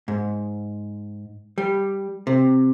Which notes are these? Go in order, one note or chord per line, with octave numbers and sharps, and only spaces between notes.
G#2
G3
C3